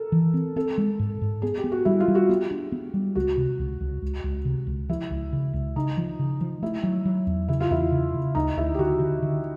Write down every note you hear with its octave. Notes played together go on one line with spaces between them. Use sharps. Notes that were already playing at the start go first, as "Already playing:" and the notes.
Already playing: A4 A#4
E3
C4
C4 A4
G#3
G#2
G#2
B3 G#4
G4
B3
F#4
G3 E4
F4
G3
F#4
B3 G4
D4
B3
G3
C#2 F#4
C3
C#2
C#2
C#2
C#2
C3
C#2
F3 E4
C#2
C#3
C#2
C#3 D#4
F3
C#3
F3
A3 E4
F#3
F#3
E2
C#3 E4
F4
E2 E4
C#3
C#3
D2 D#4
D2 E4
G4
D3 F#4
D3
D3